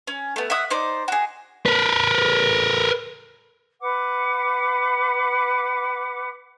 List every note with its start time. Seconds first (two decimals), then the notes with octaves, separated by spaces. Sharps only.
0.07 C#4
0.36 A3 B3
0.50 E5 F#5 D#6
0.70 D#4 C5 D5
1.08 F#4 G#4
1.66 A#4 B4
3.80 B4 F#5 D6